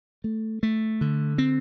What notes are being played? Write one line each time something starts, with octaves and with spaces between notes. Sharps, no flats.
A3
A3
D3
C4